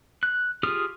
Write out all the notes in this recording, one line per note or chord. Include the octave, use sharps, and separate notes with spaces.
F#6
F4 G4 G#4 D#6 F6